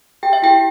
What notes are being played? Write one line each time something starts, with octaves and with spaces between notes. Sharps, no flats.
G4 G5
E5
E4 G4 G5